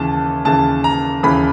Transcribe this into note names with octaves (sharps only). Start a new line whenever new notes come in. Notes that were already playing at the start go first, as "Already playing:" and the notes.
Already playing: D#2 C#3 E3 A5
D#2 C#3 E3 A5
A#5
D#2 C#3 E3 B5